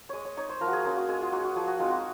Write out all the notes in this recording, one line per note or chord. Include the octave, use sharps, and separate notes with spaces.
G#3 C#5 D#5
C#5
D#4 C#5
C5
F3 A#4
F#4
G#4
A#3 C#4 F4
F#4
G#3 G#4
F4
D#4 F#4
F#4
F3 G#4
F#4
G#3 C4 D#4 F4
F#4